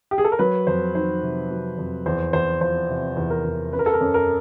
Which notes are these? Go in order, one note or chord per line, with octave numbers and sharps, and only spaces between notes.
G4
G#4
A4
A#4
F#3 B4
F2 C5
D#3 C5
C3
F#3
F2
E2 C5
E2 C5
F3 C5
C3
E2
A#4
E2
F#2 B4
A#4
A4
A#4
F#2
A#4